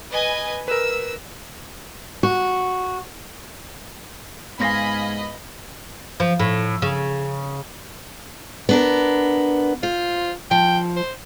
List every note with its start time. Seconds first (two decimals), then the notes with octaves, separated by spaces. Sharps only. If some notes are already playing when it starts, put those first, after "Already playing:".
0.11 B4 D#5 G#5
0.68 A#4 B4 E6
2.23 F#4
4.60 G#2 B3 D#5 F5 G#5 B5 A#6 C7
6.20 F3
6.39 A2
6.82 C#3
8.69 B3 D4 A#4
9.83 F4 C5
10.51 F3 G5
10.96 C5